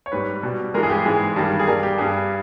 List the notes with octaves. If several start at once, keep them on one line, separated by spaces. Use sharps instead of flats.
C#5
G#2 G3 B4
B2 G3
G2 E3 G#3 A#4
G#4
G4
G#2 E3 G#3 G#4
G2 D#3 G3
G#4
G2 G3 A#4
G4
G2 G3 G#4